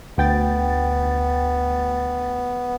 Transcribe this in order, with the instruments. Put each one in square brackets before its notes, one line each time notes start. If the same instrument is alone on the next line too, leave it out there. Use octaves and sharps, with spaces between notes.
[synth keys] D2 G5 A6 [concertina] B3